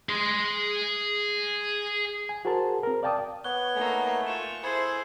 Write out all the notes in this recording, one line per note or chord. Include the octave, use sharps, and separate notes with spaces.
G#4 C6
G#5
F#4 G#4 A#4 C5 A5
C4 A#4
D5 F5 G5 A5 D6 D#6
B3 C#5 C#6 F#6 G7
A3 A#3 D#4 G#5
F4 C#6 G6 E7
E4 G#4 A4 C5 B5 G#6 F#7